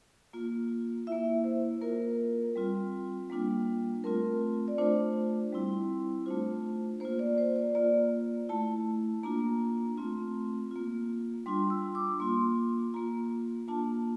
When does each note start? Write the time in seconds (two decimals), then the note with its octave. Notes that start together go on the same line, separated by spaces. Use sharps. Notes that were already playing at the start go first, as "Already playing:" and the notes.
0.33 A#3 F4
1.07 A#3 E4 E5
1.44 C5
1.81 A#3 F4 A#4
2.56 G3 C4 F4
3.30 G3 A#3 D4 F4
4.04 A3 C4 F4 A#4
4.68 D5
4.78 A3 D4 F4 C5
5.52 G3 C4 E4
6.26 A3 D4 F4 C5
7.00 A#3 F4 C5
7.19 D5
7.38 C5
7.56 D5
7.75 A#3 F4 D5
8.49 A3 E4 A5
9.23 A#3 D4 F4 A#5
9.98 A3 C4 F4
10.71 A#3 F4
11.46 G3 D4 F4 C6
11.70 E6
11.95 D6
12.20 A#3 F4 C6
12.94 A#3 F4 A#5
13.68 A#3 D4 F4 A5